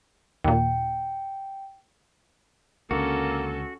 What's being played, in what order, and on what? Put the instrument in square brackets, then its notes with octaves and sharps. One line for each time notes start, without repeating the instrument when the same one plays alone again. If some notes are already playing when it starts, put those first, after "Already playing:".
[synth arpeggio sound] D#2 A#2 [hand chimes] G5
[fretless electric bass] C#2 D3 [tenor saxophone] A#3 [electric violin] C#4 A4 [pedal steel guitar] F#4